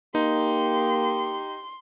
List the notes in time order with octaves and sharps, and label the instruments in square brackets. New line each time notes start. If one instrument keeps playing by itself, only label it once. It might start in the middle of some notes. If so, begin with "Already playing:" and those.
[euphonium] A#3 [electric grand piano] D#4 [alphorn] G4 [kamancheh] C6